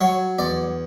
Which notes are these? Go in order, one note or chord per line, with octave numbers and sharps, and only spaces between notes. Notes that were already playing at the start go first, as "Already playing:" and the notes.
F#3 C#5
E2 D5